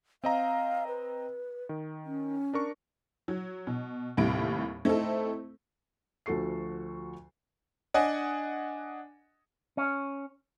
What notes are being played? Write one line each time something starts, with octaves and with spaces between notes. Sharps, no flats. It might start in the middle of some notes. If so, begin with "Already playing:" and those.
C4 D#5 F5 A#5
B4
D#3
C#4
D4 A#4 C#6
F#3
B2
D#2 A2 C3 G3 E4 D7
A3 C4 D#4 E4 A4
D2 F3 F#4 A4 C#6 C7
D4 D#5 F#5 G#5
C#4